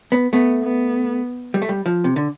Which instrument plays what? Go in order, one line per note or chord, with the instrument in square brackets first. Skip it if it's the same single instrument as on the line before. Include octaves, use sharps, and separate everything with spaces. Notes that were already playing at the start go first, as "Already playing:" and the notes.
[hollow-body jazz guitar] B3
[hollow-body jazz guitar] A3 [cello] B3
[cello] B3
[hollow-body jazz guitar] G3
A3
G3
F3
C3
D3